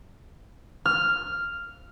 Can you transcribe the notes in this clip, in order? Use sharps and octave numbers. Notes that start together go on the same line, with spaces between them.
F6